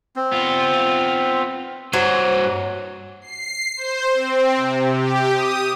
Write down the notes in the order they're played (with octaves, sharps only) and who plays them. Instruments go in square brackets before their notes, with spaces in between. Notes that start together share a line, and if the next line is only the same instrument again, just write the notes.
[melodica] C4
[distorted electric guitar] B3 F4
[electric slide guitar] G2 C5 [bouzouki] F#3
[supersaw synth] C7
C5
C4
C3
G4
D#6